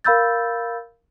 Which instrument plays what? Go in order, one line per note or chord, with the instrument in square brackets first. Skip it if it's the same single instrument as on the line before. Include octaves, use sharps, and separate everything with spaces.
[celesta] A#4 F5 B5 E6 G6 A6